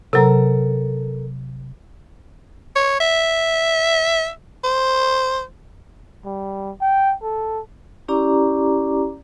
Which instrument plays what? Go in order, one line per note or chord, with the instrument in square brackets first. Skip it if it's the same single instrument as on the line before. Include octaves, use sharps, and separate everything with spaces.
[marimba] C3 F#3 [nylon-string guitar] A4 A#4
[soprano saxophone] C#5
E5
C5
[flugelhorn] G3
G5
A4
[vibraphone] C#4 E4 G4 D5 A#5 D6